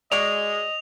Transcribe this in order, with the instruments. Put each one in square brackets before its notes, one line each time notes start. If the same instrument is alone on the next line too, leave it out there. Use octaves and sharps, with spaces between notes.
[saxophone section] G#3 [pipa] F#4 D5 [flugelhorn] D#5 [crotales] F7